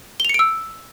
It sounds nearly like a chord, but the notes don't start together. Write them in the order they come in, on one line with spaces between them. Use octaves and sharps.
G7 F7 C#7 D7 E6